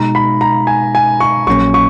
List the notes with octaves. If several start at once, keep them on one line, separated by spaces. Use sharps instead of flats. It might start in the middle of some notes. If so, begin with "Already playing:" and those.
Already playing: B2 G#3 D#4 A#5
B5
A#5
G#5
G#5
C#6
A#1 A#2 F#3 A#3 C#4 C#6
C#6